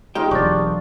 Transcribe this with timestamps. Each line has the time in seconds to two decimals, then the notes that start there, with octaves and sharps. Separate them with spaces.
0.15 G#3 D#4 F4 G4 G5
0.31 E1 F#3 D4 C#6 A6